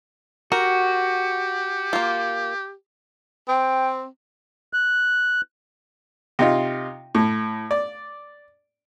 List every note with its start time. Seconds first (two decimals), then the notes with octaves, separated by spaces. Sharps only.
0.52 F#4 G4 A#4
1.93 A#3 F4
3.49 C4 G5
4.73 F#6
6.39 C3 D#4 F4
7.15 A2
7.71 D5